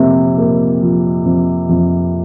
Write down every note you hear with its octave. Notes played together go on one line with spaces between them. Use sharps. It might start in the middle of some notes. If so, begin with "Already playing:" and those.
Already playing: F2 C3 A#3
A#3
F3
F2
F2